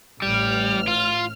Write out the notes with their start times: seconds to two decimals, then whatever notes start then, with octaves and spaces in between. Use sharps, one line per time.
0.22 A1 G3 F6
0.88 F4